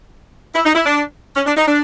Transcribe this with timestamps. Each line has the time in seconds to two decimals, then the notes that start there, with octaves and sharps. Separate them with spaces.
0.54 E4
0.65 D#4
0.75 E4
0.85 D4
1.35 C#4
1.46 D4
1.56 D#4
1.66 D4